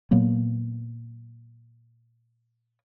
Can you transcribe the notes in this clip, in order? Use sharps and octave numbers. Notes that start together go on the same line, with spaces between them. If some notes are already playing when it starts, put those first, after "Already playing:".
A#2 F#3 A#3 B3